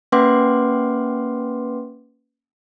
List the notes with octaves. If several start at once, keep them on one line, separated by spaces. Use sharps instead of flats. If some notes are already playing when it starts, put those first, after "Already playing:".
A#3 C#4 B4 F#5 C6 D6